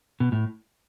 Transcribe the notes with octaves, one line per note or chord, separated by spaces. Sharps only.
B2
A2